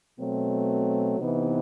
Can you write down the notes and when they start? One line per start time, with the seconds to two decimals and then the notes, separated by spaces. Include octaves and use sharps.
0.19 B2 F#3 A3 C4
1.19 C3 E3 B3 D#4